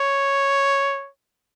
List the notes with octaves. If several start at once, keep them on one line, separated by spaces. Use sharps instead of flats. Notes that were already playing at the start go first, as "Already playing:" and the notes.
Already playing: C#5